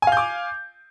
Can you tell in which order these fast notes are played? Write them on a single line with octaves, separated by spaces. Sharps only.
G#5 F5 G6 D6